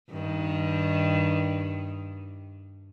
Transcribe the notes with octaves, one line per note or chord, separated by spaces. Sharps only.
G2 D#3